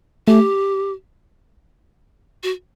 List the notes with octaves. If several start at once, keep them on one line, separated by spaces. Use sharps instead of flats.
A3 G4
F#4